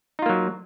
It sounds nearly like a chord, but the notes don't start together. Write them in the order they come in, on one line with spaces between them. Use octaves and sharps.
D#4 F4 A#3 F#3